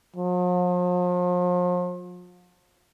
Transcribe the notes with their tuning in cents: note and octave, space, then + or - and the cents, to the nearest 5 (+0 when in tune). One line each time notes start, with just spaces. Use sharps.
F3 +40